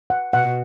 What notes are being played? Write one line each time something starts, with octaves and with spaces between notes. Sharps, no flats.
F#5
B2 F#5